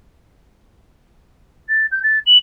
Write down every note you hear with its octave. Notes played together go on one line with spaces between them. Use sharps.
A6
G6
A6
F#7